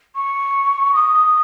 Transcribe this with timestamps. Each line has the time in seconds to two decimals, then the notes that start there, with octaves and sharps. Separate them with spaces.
0.15 C#6
0.94 D#6